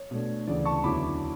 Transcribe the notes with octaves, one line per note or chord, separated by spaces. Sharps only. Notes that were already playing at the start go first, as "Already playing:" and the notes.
Already playing: C#5
B2 A3 D4
D2 C#3 E3 D5
A5 C#6
E2 D3 F#3 C#4 E4 B5 D6